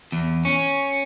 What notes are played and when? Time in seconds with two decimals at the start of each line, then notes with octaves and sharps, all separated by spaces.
0.12 E2
0.45 C#4